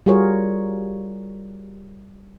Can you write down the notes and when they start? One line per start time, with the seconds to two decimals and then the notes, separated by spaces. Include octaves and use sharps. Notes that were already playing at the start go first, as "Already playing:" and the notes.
0.06 G3 F4 F#4 G#4 A#4 C#5